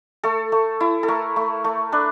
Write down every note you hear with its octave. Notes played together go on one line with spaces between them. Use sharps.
A3 A4
A3
E4
A4
A3 A#4
A3
A3
D4 B4